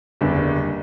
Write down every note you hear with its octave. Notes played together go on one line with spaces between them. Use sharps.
F#1 E2 D3 G3